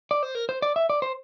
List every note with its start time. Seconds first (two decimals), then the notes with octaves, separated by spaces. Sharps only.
0.11 D5
0.23 C5
0.35 A#4
0.49 C5
0.62 D5
0.76 E5
0.90 D5
1.02 C5